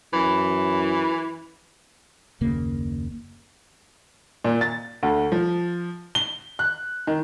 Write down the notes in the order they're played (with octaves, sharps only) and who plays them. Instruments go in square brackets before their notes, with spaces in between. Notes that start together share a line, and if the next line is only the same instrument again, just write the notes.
[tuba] F#2 [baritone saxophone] E3
[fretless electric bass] F#1 D#2 C#3 A#3
[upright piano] A#2
A6
D2
F3
G7
F#6
D#3